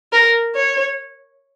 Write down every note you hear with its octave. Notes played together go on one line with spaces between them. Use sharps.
A#4
C#5